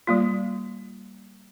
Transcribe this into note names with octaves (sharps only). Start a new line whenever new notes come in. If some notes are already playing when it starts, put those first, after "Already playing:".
G3 A#3 F4